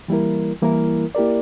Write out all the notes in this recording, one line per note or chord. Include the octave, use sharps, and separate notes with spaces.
E3 G3 A#3 E4 A#4
E3 G3 A#3 E4 A#4
A#3 E4 G4 A#4 D5